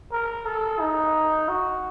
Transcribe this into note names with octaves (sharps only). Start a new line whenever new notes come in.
A#4
A4
D#4
F#4